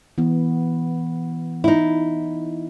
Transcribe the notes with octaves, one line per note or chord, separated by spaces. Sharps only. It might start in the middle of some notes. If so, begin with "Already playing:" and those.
E3 B3
D#4 E4